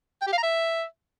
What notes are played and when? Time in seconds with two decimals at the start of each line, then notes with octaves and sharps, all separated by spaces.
0.22 G5
0.27 G4
0.32 F5
0.38 A#5
0.43 E5